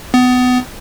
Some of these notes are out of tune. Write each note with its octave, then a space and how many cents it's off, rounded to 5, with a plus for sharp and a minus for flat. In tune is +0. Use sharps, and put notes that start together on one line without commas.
B3 +25